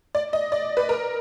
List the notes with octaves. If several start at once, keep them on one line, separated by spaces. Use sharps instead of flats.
D5
D#5
D5
B4
A#4